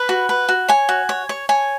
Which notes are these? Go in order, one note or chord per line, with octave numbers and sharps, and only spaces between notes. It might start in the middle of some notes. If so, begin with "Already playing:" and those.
Already playing: B4 B5
F#4
B4
F#4
C#5 G#5
F#4
C#5
C#5
C#5 G#5